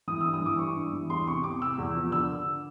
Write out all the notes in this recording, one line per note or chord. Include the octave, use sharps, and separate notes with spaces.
E3 D#6
E6
G2
D#6
E3 D6
G2 C#6
G2
E3
E2 C6
C3 C#6
C3 D6
C3 E6
E2
F3
D3 E6
D3